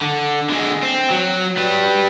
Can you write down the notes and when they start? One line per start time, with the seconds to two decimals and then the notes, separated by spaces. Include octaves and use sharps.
0.02 D3
0.49 D3 G#3
0.82 C4
1.10 F#3
1.57 G3 B4